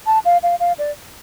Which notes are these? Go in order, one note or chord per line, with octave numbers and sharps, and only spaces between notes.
A5
F5
F5
F5
D5